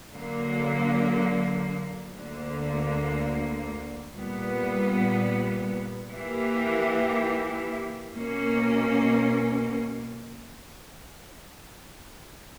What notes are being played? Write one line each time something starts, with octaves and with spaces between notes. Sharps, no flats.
D3 F#3 A#3
D2 D3 A#3
A#2 G3 B3
E3 A#3 E4 G4
B2 A#3 C#4